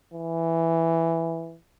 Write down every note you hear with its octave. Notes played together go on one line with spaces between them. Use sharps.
E3